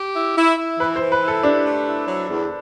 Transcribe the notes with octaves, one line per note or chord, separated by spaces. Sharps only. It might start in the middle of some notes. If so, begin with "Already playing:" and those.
Already playing: G4
E4
E4
E4
E3 B4
C5
E3
B4
E4
A4
D4 G4
A3
E4
F#3
E2